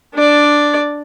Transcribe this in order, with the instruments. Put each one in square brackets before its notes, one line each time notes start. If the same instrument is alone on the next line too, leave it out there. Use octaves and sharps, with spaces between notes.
[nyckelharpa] D4 D5